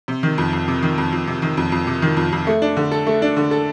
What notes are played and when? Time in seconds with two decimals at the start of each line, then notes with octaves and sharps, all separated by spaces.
0.08 C3
0.23 D#3
0.38 F2
0.53 F2
0.68 C3
0.83 D#3
0.98 F2
1.12 F2
1.27 C3
1.42 D#3
1.57 F2
1.72 F2
1.87 C3
2.02 D#3
2.17 F2
2.32 F2
2.47 A3
2.62 D4
2.77 D3
2.92 A4
3.07 A3
3.22 D4
3.37 D3
3.51 A4